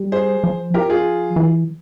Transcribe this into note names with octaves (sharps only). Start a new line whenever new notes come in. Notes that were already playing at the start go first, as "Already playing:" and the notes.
Already playing: G3
G#4 C5
F3
F3 G4 A#4
F4 G#4
E3